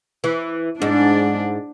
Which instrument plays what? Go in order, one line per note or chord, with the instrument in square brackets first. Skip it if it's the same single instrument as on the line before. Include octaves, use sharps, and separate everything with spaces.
[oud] E3
[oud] G#2 [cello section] D4